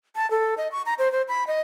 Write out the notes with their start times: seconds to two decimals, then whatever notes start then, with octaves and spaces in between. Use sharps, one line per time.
0.16 A5
0.31 A4
0.58 D#5
0.72 C#6
0.86 A#5
0.99 C5
1.12 C5
1.28 B5
1.47 D#5